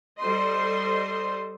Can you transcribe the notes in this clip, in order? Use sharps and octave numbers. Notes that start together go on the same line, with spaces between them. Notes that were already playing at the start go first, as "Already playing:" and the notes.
G3 A4 C5 D#5 C6